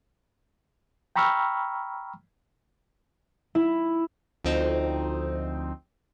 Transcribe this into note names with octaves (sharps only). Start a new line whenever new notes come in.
G5 A#5 B5 C#6 E6 F6
E4
D2 F3 C4 D#4